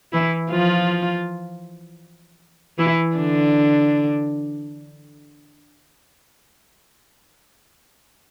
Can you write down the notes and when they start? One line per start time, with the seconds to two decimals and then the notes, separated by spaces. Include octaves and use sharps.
0.13 E3 E4
0.51 F3 F4
2.78 E3 E4
3.17 D3 D4